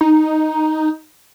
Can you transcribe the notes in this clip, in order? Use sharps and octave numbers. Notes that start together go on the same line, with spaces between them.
D#4